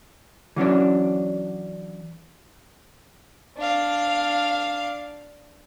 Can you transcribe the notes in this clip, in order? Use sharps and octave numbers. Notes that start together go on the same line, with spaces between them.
E3 F#3 C#4 D4
D4 F5